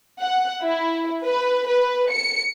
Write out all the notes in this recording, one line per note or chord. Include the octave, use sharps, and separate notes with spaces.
F#5
E4
B4
B4
C#7